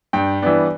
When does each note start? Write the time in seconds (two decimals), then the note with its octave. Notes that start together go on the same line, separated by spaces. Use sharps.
0.13 G2 G5
0.42 E3 G3 B3 D4